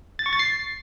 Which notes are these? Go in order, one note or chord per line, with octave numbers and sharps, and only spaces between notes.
A6
C#6
A6
C7